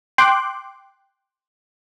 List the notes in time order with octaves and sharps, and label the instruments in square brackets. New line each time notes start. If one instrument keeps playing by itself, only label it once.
[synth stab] G5 C6 D6 F#6